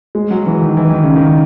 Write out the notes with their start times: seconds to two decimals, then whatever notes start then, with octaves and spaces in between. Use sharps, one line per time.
0.15 G#3
0.31 F#3
0.46 E3
0.62 D#3
0.77 E3
0.90 D#3
1.03 C#3
1.16 D#3